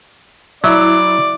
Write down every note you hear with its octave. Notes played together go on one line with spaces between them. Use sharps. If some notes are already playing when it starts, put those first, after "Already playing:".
F#3 E4 D5